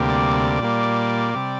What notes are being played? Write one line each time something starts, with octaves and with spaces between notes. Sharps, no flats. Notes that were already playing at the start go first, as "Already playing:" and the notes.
Already playing: D2 C3 G3 A#3
D5
A#2 G3 A#3
C3 G3